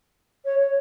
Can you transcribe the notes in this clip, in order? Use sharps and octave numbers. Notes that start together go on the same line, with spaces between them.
C#5
C#5